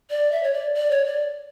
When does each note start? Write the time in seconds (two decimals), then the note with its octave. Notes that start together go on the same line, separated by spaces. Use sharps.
0.10 D5
0.32 E5
0.43 C#5
0.54 D5
0.76 D5
0.90 C#5
1.05 D5